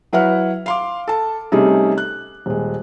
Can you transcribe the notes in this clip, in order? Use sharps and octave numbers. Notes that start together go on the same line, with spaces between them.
F#3 E4 B4 F#5 F6
F5 C6 D6
A4 A5
C3 G3 A3 C#4 D#4 G#4
F#6
D#1 G#3